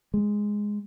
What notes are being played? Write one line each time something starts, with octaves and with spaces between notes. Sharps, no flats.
G#3